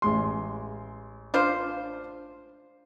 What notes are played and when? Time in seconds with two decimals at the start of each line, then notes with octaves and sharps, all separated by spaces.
0.02 A1 G#3 C6
1.34 D4 F4 C5